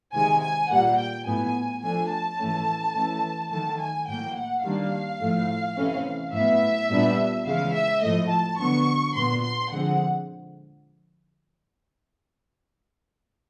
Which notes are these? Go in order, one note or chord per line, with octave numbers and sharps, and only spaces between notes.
C3 D#3 G#3 G#5
G#5
A#2 G3 A#3 F#5
G5
A2 F#3 B3 G#5
F3 A3 D4 G#5
A5
A2 E3 A3 C#4
E3 A3 C#4
D#3 F#3 A3 A5
G#5
A2 F#3 A#3 G5
F#5
D#3 G3 A#3 D4 F5
A2 F3 A3
C3 E3 A3 C#4
A2 F#3 B3 E5
A#2 G3 B3 D4
C#3 E3 G#3 F5
E5
A2 F3 A3 D#5
A5
D3 F#3 B3 C#6
A#2 F#3 B3 C6
C6
D3 F3 G#3 C4 F#5